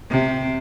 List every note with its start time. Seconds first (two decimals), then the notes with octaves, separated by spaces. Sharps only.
0.10 C3